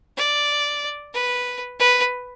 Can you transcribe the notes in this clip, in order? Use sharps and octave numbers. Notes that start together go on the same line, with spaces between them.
D5
B4
B4